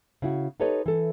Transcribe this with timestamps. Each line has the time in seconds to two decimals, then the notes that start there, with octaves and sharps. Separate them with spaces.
0.22 C#3 E4 F#4
0.60 D#4 G4 A4 B4 C#5 D#5
0.86 E3 A4